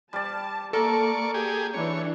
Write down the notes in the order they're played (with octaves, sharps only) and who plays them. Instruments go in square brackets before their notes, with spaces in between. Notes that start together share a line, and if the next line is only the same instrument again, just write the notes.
[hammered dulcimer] G3 D5 [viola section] A5
[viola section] A#3 [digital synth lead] A4 [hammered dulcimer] A#4 A5 [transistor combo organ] D5 C#6
[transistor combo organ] G4 G#4
[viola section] E3 D4 [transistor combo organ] C#5